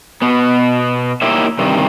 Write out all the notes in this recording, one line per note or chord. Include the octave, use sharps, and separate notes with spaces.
B2 B3
A#3 D#4 E4 G4 C#5 E5
G2 C3 D#3